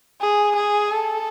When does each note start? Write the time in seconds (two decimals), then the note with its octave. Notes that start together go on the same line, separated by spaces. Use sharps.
0.21 G#4
0.55 G#4
0.91 A4